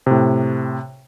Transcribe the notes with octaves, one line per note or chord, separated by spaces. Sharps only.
A2 C3